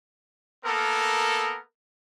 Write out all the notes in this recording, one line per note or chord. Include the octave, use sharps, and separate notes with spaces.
A#3 B3 A4 A#4